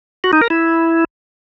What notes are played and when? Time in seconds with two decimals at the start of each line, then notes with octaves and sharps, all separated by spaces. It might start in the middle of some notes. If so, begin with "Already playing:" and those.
0.24 F#4
0.33 D#4
0.41 A#4
0.50 E4